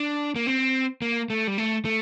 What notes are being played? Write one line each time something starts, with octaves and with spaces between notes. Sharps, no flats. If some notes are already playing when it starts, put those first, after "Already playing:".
Already playing: D4
A#3
C4
A#3
A3
G3
A3
A3